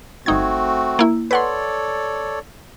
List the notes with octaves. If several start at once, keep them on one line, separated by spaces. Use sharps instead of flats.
G1 A3 C4 D#4 F#4 G#6
A#3 E4
A4 B4 C#5 D5 F#5 C6